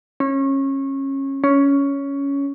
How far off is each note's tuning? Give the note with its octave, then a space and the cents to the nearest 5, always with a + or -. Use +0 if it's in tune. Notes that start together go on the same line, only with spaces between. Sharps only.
C#4 -25
C#4 +10